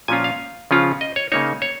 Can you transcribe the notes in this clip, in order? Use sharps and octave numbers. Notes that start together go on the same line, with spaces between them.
A#2 F3 C#4 F4 G#5
F5
C#3 F3 C#4 F4
D#5
C#5
C#3 A#3 D#4 C#5
C#5